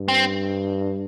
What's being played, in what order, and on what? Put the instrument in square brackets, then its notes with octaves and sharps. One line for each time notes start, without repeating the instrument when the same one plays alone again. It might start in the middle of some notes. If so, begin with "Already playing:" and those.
Already playing: [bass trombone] G2
[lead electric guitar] C4